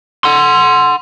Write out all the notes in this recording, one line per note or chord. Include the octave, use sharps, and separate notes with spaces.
F#5 C6